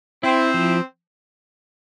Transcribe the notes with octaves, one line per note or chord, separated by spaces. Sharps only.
C4 E4
F3